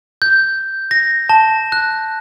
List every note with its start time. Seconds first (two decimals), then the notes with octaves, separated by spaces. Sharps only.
0.22 G6
0.91 A#6
1.29 A5
1.72 F#6